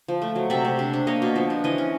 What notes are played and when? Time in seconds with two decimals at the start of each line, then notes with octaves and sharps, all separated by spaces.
0.08 F3
0.22 A3
0.36 F#3
0.50 C3 D5 E5
0.65 C3
0.79 D4
0.93 D4
1.07 A#3 C#5 D#5
1.22 B2
1.36 F3
1.50 D4
1.64 E3 C#5 D#5
1.78 C#4